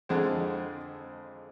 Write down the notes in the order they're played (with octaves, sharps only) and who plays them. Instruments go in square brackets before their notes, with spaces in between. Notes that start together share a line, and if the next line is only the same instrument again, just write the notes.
[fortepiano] F2 D3 G#3 C4